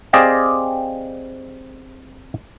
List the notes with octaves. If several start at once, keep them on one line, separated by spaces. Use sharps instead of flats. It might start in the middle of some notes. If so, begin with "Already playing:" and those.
C4 G4 G#4 D5 D#5 F5